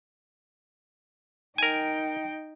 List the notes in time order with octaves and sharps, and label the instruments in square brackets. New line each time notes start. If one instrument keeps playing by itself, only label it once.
[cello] D#4 G5 [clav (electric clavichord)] A#4 G#5